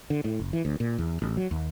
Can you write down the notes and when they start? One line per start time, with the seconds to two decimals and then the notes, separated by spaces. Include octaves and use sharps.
0.10 D3
0.24 A2
0.40 F#1
0.53 E3
0.65 D2
0.80 A#2
0.98 E2
1.22 A1
1.37 F#3
1.51 D#2